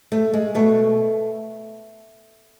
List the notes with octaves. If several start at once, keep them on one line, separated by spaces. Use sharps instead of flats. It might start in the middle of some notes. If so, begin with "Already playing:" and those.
A3
G#3
B2 A3